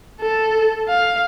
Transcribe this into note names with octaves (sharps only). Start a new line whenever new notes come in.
A4
F5